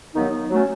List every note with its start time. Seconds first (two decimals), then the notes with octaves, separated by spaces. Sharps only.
0.15 D#2 D#3 F#3 B3 D#4
0.50 F#3 A3 C#4